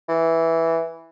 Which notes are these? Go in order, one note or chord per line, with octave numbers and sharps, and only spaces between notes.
E3